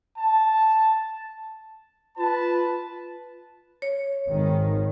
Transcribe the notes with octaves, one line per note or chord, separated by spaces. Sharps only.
A5
F4 B4 A5
C#5
G#1 D#3